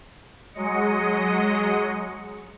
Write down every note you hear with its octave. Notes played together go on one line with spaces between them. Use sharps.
F#3 G#3 D#5 C#7